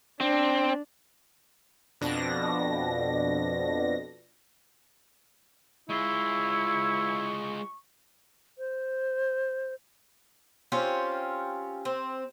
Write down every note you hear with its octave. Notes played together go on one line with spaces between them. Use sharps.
C4 D4
F2 B2 D4 A#6
G#3 E4 F4 C#6
C5
C4 C#4 F4 G4
C4